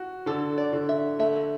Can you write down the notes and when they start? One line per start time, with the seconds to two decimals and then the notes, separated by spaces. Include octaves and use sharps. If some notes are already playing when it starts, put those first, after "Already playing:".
Already playing: F#4
0.26 D3 A4
0.58 D5
0.73 D3
0.89 E5
1.19 A3 E5